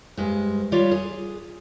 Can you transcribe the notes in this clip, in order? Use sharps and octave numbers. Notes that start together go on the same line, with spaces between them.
G2 G#3 C5
G3 F4 B4 C#5 D5
G#4